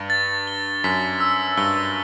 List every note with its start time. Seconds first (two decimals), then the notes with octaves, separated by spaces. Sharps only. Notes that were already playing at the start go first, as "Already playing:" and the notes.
Already playing: G2
0.10 A6
0.47 G7
0.84 F#2 B6
1.20 E6
1.57 G2 G7